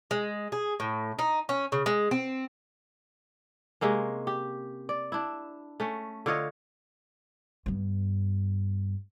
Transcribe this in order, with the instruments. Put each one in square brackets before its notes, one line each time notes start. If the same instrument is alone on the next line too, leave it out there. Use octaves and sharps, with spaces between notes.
[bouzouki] G#3
G#4
A2
D#4
C#4
C#3
G#3
C4
[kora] C3 G#3 A#3 C#4
G4
D5
D4 E4
A3 C#4
D3 F4 C#5 D#5
[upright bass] G2 B3